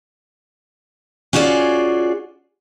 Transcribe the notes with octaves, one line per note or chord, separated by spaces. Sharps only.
C#4 F4 F#4 G#4 D5